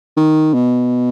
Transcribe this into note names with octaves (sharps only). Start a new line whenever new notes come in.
D#3
B2